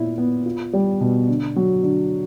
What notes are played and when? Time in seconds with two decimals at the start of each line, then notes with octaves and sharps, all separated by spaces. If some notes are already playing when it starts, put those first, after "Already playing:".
Already playing: A#2 B3 E4
0.18 B3
0.46 F4
0.73 G3
1.01 B2
1.28 D3
1.56 F#3
1.84 D3